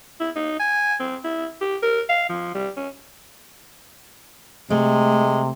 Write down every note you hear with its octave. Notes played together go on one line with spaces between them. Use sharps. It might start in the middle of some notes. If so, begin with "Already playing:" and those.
E4
D#4
G#5
C4
E4
G4
A#4
F5
F3
G3
C#4
C3 G#3 A3